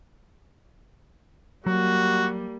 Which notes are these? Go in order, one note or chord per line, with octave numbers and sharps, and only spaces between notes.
F#3 G3 A#3 F#4